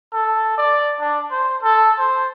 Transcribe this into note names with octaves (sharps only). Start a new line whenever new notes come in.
A4
D5
D4
C5
A4
C5